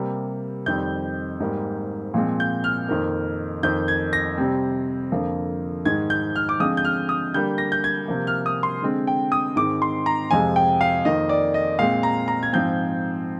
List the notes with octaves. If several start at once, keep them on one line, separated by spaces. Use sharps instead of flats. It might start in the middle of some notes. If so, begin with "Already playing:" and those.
Already playing: C3 G3 A#3
F2 D#3 G3 C4 G6
G#2 G3 A#3
A#2 F3 G#3 C4
G6
F6
F2 D#3 A#3
F2 D#3 A#3 G6
G#6
A#6
C3 G3 C4
F2 D3 F3 A#3
G#2 D#3 G#3 G#6
G6
F6
D6
D3 F3 G#3 C4 D#6
G6
F6
D#6
D3 G3 A#3 G6
A#6
G6
G#6
C3 F3 A#3
F6
D#6
C6
D3 G#3 C4
G5
D#6
G#2 D#3 G#3 C4 D6
C6
A#5
F2 C3 F3 G#3 G#5
G5
F5
F2 D#3 A#3 D#5
D5
D#5
A#2 G#3 C4 F5
A#5
A#5
G#6
G#2 F3 C4 G6